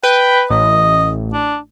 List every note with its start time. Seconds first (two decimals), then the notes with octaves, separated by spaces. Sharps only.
0.03 B4 G5
0.50 A1 D#5
1.33 D4